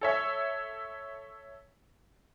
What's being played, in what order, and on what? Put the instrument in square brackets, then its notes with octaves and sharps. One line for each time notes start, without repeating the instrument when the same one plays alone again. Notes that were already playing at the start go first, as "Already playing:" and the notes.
[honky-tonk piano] A4 C#5 E5